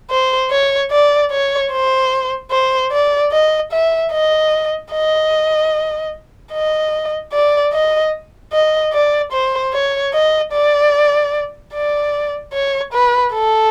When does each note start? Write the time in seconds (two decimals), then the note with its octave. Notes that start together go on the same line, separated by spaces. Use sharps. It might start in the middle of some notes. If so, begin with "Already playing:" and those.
0.10 C5
0.50 C#5
0.91 D5
1.31 C#5
1.72 C5
2.51 C5
2.92 D5
3.32 D#5
3.72 E5
4.12 D#5
4.92 D#5
6.53 D#5
7.33 D5
7.73 D#5
8.53 D#5
8.93 D5
9.32 C5
9.73 C#5
10.13 D#5
10.53 D5
11.73 D5
12.53 C#5
12.93 B4
13.33 A4